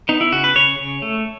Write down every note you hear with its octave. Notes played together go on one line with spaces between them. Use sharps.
B3 D#4
E4
C#3 F#4
B4
C#3 C#5
C#3
A3